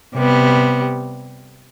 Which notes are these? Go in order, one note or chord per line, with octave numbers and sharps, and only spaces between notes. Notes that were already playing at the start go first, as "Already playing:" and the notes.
C3 G3 B3